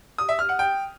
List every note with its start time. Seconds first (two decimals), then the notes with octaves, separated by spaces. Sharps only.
0.18 D#6
0.29 E5
0.39 F6
0.49 F#5
0.59 G5